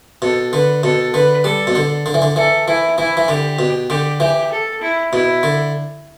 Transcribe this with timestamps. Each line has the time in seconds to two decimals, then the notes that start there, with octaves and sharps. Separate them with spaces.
0.22 B2 A4
0.53 D3 B4
0.83 B2 A4
1.14 D3 B4
1.44 G3 A4
1.67 B2
1.75 D3
2.06 D3
2.14 E3
2.22 D3
2.36 E3 A4
2.68 E3 E4
2.98 E3 E4
3.17 E3
3.28 D3 G4
3.59 B2
3.90 D3 G4
4.20 E3 G4
4.51 A4
4.81 E4
5.13 B2 E4
5.43 D3